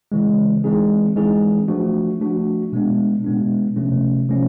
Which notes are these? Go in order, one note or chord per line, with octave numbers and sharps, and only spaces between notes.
C#3 E3 G#3
E3 G#3 C4 D#4 G#4
E3 G#3 C4 D#4 G#4
F3 A3 D4 F#4
F3 A3 D4 F#4
B2 G#3 B3 D4
B2 G#3 B3 D4
C3 F3 A3 C#4
C3 F3 A3 C#4